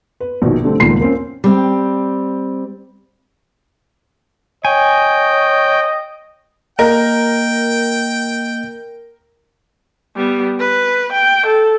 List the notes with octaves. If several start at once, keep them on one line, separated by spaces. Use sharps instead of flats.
B4
A#1 B2 D#3
D3 G3 A3 C4
D#1 C#2 A#2 D#3 B5 C7
A#3 C4 C#4 F4
G3 C4
C#5 D#5 G5 G#5
A#3 A#4 D#5 G5 F#6
G3 B3
B4
G5
A4